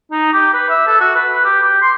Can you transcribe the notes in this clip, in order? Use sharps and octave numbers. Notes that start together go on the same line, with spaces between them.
D#4
G4
B4
E5
A4
F#4
B4
G4
G4
C6